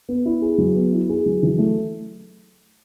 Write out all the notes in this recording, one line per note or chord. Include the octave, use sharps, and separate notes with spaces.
B3
E4
G#4
F#3
B3
E4
G#4
F#3
E3
A3